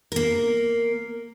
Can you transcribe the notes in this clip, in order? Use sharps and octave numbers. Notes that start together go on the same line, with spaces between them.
A#3 A#4